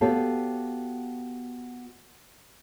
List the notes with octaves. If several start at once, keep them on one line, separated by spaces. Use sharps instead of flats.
B3 F#4 G4 A4 C#5 F5